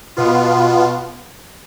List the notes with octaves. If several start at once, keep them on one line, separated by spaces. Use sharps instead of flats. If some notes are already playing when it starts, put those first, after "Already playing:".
B2 B3 F4